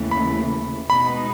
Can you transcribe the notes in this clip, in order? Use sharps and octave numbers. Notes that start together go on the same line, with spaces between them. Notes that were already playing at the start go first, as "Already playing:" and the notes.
Already playing: D#2 C#3 E3 A3
B5
B2 G#3 B3 D#4 B5